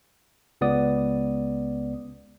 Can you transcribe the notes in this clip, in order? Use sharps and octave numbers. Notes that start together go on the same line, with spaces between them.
C#2 B3 D5 D#6